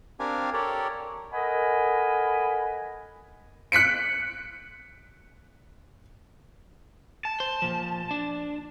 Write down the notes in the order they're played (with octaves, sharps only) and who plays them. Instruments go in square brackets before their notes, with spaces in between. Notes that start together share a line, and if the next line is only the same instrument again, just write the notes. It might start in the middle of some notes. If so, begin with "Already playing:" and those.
[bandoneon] C4 D4 G4 A#4 F5 G#5
G4 A4 A#4 C#5 D5
[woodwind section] A4 A#4 D#5 F#5 G#5 B5
[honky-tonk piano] F#6 B6 C#7 D7
[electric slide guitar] A5
[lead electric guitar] C5
A#2 F3
D4